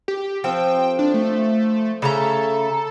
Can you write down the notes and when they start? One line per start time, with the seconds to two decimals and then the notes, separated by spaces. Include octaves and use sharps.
0.08 G4
0.44 F3 C4 A4 G5
0.99 D4
1.14 A3
2.02 C#3 A3 A4 A#5